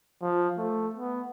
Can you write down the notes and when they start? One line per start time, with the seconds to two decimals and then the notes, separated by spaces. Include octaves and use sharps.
0.22 F3
0.58 A3
0.95 B3